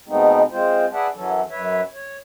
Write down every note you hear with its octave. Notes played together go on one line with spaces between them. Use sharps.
B2 G#3 A3 B3 C4 D#4
G#3 C4 F4 C5
G#4 B4 D5 E5 F#5 A5
F#2 E3 F#3 C#4 A4
F#2 B4 C#5 E5
C#5